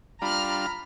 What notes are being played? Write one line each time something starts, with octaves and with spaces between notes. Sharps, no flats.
G3 D4 F4 A#5 B5 F6